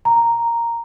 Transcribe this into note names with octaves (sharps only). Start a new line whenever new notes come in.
A#5